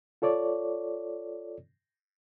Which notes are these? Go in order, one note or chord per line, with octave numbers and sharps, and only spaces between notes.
F4 A4 C#5 D5